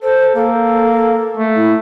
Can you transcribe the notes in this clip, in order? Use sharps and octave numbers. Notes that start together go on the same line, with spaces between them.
A4 C5
A#3 A4
A3
E4